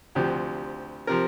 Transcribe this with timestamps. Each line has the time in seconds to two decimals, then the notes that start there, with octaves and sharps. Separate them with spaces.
0.15 D2 C3 F3 G4
1.07 C3 F3 A#4